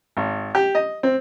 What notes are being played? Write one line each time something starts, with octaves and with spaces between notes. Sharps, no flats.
G#1
G4
D#5
C4